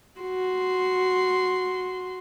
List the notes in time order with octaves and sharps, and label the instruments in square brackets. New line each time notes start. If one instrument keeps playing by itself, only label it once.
[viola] F#4 C6